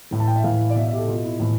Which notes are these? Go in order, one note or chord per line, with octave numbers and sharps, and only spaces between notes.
A2 E3
A5
G5
E5
A2 E3 F5
D5
B2 E5
E5
G4
A4
B2 F4
E4
A2 E3